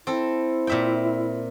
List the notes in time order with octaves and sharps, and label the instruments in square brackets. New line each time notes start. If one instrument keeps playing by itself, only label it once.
[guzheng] C4 A4 [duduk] E4
[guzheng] A#2 E5 G5